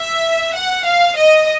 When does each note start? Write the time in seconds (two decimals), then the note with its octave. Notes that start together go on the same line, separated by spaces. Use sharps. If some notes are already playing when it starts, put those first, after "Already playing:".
Already playing: E5
0.55 F#5
0.86 F5
1.17 D#5